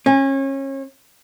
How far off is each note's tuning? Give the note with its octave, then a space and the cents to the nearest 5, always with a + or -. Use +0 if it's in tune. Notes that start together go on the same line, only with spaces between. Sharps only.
C#4 -30